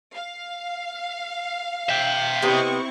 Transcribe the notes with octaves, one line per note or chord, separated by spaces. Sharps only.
F5
E5 G5
C3 B3 C4 E4 D#5 C#6